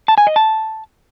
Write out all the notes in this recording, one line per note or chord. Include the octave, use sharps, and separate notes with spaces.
A5
G#5
D#5
A5